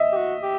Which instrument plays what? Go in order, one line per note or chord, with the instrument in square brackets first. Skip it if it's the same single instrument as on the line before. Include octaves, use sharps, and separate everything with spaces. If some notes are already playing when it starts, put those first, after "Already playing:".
Already playing: [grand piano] D#5 E5
[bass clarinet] G4
F#4
G4